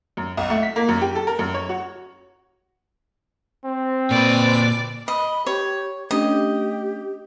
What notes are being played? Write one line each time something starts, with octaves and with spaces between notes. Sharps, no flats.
F#2
B1
A3
B6
A#3
F#2
G4
A4
A#4
F#2
C#5
F#4
C4
A#2 B4 D5
D#5 B5
G4 C#5
A3 C#4 D4 G4 D#5